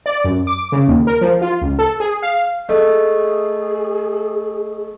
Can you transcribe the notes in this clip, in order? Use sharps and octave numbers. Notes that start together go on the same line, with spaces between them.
D5
F#2
D6
C#3
D#2
A#4
F3
F4
C#2
A4
G#4
F5
A3 G#4 D#5 E5